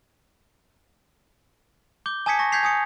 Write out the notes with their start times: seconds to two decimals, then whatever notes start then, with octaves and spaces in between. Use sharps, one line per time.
2.06 D6 G6 G7
2.26 G#5 A5 D#6 G#6 B6 C#7
2.39 C#6 A#6
2.52 G6 G#6 B6 C7 F7
2.63 G#5 D#6 C#7